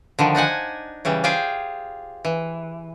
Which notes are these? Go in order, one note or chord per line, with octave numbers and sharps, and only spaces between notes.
D3 D#3 F3
D4 D#4 F#5 G#5
C#3 E3 G3
F4 G4 G#4 C5 F5 G5
E3